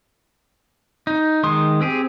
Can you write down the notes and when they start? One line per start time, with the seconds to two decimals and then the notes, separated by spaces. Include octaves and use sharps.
1.07 D#4
1.43 D#3 G#3 C6 D#6
1.81 C4 G4 G#4